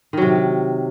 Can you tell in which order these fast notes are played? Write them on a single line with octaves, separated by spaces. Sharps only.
D#3 F#3 C3